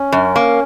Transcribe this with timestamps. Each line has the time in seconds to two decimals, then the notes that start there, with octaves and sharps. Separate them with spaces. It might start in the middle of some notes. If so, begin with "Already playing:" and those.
Already playing: C#4
0.12 F#2
0.36 A#3